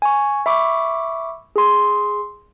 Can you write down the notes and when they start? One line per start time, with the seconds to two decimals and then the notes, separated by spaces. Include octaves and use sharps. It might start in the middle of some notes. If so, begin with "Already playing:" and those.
0.02 G#5 C#6
0.46 E5 B5 C#6 D6
1.56 G#4 C6